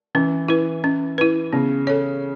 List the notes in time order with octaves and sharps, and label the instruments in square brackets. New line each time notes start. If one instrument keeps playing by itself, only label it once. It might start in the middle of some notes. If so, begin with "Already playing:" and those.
[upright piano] E3 [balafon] C#4
[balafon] E4 B4
C#4
E4 B4
[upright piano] C#3 [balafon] B3
[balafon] A4 C#5